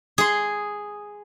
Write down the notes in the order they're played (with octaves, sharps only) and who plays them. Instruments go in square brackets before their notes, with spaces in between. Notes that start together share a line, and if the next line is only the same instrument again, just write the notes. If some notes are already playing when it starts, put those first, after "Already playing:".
[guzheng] G#4 C6